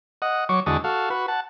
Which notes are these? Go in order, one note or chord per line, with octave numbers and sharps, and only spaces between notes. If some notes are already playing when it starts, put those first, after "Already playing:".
D#5 F#5
F#3 C#5 C#6 D6
E2 D3 G#3 F#4 D#5 A5
F#4 A4 F5
F#4 B4
F#5 A5